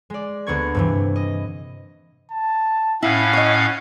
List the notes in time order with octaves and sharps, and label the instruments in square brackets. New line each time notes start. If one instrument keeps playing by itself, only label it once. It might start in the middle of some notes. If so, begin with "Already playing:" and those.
[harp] G#3 D5
D2 A#3 B3 C#6 G#6
G2 C3 E3
D#5
[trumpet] A5
[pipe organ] A2 C#4 F5 [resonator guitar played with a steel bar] E4 [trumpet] F#5
[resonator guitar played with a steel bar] C#5 D#5